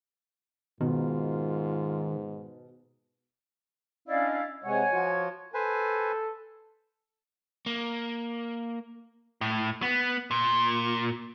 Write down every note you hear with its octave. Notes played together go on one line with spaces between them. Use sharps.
G#2 B2 D#3 F4
C#4 D4 E4 D5 D#5 F5
C3 G#3 C#5 F#5 G#5
F3 F4 F#4
A4 B4 C5 G#5
A#3
A2
B3
A#2